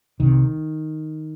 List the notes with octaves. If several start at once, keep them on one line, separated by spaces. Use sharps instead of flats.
C2 C3 D#3